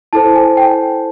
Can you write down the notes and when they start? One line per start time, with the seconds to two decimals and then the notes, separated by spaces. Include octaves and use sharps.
0.13 E4 A4 C5 A5
0.35 G#5
0.57 G5